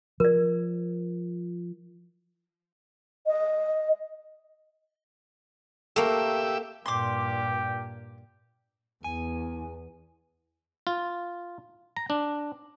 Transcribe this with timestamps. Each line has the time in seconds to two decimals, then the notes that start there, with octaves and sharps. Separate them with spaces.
0.20 F3 A#4 D5
3.27 D#5
5.96 A3 A#3 G4 E5
6.86 G2 A#2 G4 C6 D6
9.04 E2 G#5
10.87 F4
11.96 A#5
12.10 D4